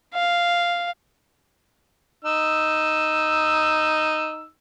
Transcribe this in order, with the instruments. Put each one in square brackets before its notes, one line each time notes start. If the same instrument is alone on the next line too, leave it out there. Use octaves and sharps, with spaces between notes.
[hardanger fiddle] F5
[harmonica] D#4 E6